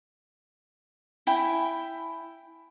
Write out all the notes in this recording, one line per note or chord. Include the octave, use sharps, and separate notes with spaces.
E4 G5 G#5 B5